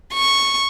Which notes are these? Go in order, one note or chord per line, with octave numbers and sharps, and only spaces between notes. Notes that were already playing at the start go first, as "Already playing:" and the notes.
C#6